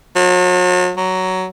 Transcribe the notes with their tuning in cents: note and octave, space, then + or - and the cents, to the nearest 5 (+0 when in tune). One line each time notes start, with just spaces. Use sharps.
F#3 -40
F#3 +10